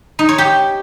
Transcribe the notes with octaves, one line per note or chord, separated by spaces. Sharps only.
D#4
C#5
G4